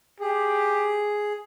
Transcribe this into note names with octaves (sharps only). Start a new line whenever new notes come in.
G4 G#4